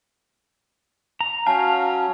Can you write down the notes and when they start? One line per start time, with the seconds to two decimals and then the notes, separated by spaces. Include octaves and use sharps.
1.21 A#5
1.47 F#3 C#4 F5 A5